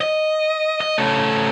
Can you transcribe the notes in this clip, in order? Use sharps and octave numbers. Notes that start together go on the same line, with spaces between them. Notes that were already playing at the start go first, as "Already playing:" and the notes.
D#5
D#5
C#3 A3